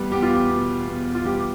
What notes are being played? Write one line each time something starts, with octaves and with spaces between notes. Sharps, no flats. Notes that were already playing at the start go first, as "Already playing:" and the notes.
Already playing: E2 G3 B4
E2 G4
F4
G4
B2
E2
F4
G3 G4
G4